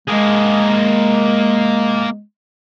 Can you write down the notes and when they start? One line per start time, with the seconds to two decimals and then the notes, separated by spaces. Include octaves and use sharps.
0.08 G#3 A#3 G#4